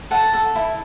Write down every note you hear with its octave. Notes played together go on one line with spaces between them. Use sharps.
A4 F#5 A5
A4
E4